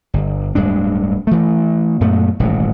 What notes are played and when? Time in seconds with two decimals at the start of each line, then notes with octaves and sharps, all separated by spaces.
0.14 G1
0.55 D1 G2 G#3 D4
1.27 E3 A3
2.01 F#2 A#2 A3 B3
2.40 D#1 A1 G#2 B2